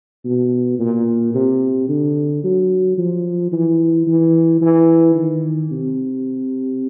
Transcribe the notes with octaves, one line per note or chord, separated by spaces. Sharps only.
B2
A#2
C3
D3
F#3
F3
E3
E3
E3
D#3
C3